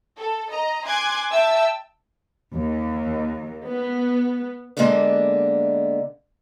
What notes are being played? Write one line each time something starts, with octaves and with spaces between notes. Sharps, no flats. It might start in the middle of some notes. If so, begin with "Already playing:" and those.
A4
D#5 A#5
G#5 C6 D6 F#6 G#6
E5 G5 A5 E6
D#2
B3
D3 G#3 A#3 B3 A4 B4